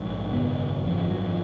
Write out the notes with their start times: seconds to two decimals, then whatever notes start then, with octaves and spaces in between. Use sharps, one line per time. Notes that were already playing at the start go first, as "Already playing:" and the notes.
Already playing: A#1 G#2
0.31 G#1 F#2 C#3 B3
0.84 G#1 F#2 C#3 F3
0.97 F3
1.10 F#3
1.23 F3